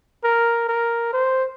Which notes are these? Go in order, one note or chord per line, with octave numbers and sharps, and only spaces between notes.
A#4
A#4
C5